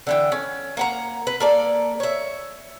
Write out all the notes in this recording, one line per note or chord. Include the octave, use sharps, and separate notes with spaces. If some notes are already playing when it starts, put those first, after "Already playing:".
D3 E3 G5
C#4
A#3 F#5 A#5
B4
A#3 A4 D5
C#5 E5